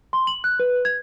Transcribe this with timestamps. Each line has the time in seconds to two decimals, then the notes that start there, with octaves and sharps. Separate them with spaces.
0.13 C6
0.27 F#7
0.44 F#6
0.60 B4
0.85 G#6